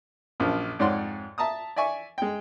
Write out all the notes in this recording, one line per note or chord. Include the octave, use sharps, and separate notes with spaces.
A#1 F#2 F3
F2 G#2 C#5 D5 F#5 C6
E5 A5 A#5 D#6
D5 E5 G#5 C#6
G#3 G5